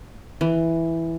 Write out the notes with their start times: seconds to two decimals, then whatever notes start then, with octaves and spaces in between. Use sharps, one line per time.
0.41 E3